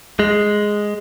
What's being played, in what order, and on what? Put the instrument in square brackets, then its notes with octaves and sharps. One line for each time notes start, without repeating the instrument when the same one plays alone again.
[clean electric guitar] G#3